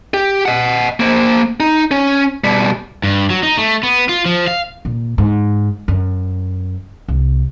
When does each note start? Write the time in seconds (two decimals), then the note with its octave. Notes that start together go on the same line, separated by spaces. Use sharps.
0.14 G4
0.46 D#5 F#5
1.00 A#3 C5
1.60 D#4
1.91 C#4
2.44 B2 G3
3.03 G2
3.30 F#3
3.43 D#4
3.57 A3
3.83 B3
4.09 F4
4.26 F3
4.48 F5
4.85 A#2
5.18 G#2
5.88 F#2
7.08 C2